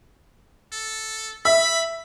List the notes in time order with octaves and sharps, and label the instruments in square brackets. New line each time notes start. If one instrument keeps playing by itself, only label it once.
[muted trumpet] A4
[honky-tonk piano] E5 [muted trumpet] B5